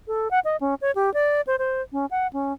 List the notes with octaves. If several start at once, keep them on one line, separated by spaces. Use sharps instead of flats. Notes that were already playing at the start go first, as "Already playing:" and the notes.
A4
F#5
D#5
C#4
C#5
G4
D5
C5
C5
C#4
F#5
C#4